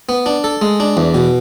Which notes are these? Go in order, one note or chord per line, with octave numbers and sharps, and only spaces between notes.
B3
D4
A4
G#3
D4
E2
B2